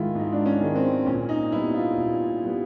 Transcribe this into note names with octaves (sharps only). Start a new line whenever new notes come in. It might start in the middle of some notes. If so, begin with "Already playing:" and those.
Already playing: G#2 D#3 G#3 E4 F4
G#2 D#4
D4
C#4
D#3 G#3
C4
A#2 C#4
D#4
G3 B3 E4
F4
A#2
G3 B3